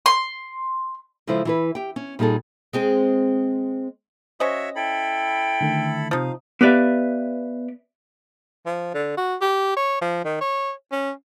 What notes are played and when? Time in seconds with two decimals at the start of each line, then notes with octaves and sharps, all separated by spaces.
0.06 C6
1.27 C#3 F3 G#3 E4 A4 C5
1.45 E3 E4 B4
1.75 G4 G5
1.96 C#4
2.19 A#2 G3 D#4 G#4 A4
2.73 G#3 C4 G#4
4.40 C#4 F#4 C5 C#5 D#5 E5
4.76 E4 A4 G5 B5
5.61 D3 D#3 A3
6.11 C3 F3 D#4 F5 D#6
6.61 B3 G4 B4 D5 E5 F5
8.66 F3
8.94 D3
9.17 F#4
9.41 G4
9.77 C#5
10.01 F3
10.24 D#3
10.41 C#5
10.92 C#4